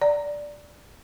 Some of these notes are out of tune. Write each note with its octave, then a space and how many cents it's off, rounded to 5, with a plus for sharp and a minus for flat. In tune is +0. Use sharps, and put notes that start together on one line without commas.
D5 +0 A#5 -10